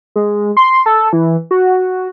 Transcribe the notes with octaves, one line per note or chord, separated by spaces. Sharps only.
G#3
C6
A4
E3
F#4